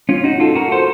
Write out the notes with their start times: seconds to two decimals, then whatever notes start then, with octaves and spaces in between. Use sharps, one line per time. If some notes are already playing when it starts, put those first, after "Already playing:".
0.09 C#4 F4
0.24 D#4 F#4
0.40 F4 A4
0.55 F#4 A#4
0.72 A4 C5